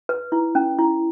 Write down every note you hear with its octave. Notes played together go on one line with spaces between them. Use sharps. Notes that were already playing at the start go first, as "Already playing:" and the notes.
B4
E4
C#4
E4